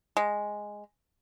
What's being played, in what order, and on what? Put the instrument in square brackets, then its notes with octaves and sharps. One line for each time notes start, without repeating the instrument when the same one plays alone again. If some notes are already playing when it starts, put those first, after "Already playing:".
[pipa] G#3